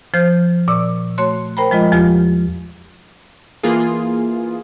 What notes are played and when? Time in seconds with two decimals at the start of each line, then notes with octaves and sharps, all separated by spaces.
0.14 F3 C5 F6 G6
0.68 A#2 D5 C#6 E6
1.18 A3 F#4 C#5 C6 F#6
1.57 A#4 C5 G5 A#5 B5
1.71 F3 G#3 F4 D#5
1.92 E2 F3 F4 G4 F6
3.63 E3 A#3 F4 G#4